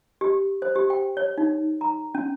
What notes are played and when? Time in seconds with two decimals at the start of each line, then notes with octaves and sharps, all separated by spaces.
0.21 G4
0.62 C5
0.75 G4
0.90 G5
1.17 C#5
1.38 D#4
1.81 A#5
2.15 C#4